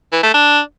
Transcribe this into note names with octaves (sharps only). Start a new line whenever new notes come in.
E3
A3
D4